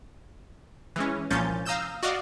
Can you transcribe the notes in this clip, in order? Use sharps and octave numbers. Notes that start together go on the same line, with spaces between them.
E3 G#3 C#4
C2 A#2 F3 C#4 G6 A6
F5 A#5 D#6 E6 G6 E7
F#4 D5 D#5 F5